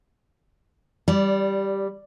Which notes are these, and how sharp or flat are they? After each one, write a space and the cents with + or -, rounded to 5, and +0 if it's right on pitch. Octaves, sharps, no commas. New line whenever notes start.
G3 +0 D5 -20